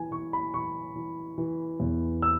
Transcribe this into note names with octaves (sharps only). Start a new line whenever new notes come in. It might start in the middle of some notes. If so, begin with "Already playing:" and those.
Already playing: E3 G#5
E3 C#6
B5
E3 C#6
E3
E3
E2
E6